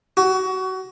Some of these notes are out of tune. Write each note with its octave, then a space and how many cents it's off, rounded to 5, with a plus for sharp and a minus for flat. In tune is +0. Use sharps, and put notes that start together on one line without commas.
F#4 +25